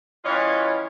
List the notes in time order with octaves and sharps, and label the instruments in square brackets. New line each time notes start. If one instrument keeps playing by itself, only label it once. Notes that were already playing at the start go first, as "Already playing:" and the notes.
[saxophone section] E3 G3 C#4 F4 C#5 D#5